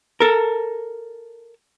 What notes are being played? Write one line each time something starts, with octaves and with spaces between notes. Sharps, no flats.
A4 A#4